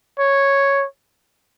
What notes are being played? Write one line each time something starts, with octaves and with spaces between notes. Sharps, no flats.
C#5